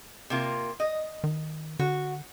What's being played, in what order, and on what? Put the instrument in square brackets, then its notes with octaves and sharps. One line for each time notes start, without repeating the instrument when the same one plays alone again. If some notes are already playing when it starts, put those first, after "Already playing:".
[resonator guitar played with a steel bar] C3 A#3 F4
D#5
[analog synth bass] D#3
[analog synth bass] D3 [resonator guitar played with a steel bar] F#4